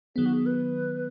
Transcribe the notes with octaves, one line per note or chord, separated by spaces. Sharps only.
D#3 F#3 B3 G#4
F#4
G#4
B4